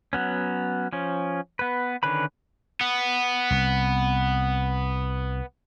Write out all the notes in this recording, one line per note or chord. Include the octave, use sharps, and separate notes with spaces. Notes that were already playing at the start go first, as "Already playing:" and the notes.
F#3 B3 C#4
F3 C#4
B3 B4
D3 D#3 C#4 B4 B5
B3
C2